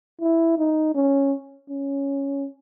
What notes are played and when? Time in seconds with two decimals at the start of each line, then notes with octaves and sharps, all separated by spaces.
0.21 E4
0.58 D#4
0.95 C#4
1.70 C#4